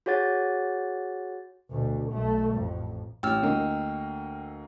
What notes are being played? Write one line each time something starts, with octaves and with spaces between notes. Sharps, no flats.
F#4 G#4 C#5 F#5 A6
D2 B2
B1 A3
A1 F2
A1 G5 E6 F6
D2 A#3 D#5